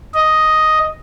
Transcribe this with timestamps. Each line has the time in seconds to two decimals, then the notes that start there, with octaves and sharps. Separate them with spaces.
0.14 D#5